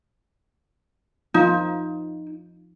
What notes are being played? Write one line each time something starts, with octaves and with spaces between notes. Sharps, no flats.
F3 D#4 F4